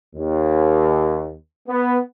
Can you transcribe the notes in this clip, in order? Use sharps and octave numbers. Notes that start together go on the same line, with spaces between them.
D#2
B3